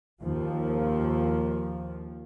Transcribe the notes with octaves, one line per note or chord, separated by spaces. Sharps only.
D#2 F3